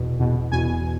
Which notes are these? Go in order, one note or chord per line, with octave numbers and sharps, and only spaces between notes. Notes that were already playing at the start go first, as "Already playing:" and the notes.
Already playing: E2 B2
E2 B2
E2 B2 G#5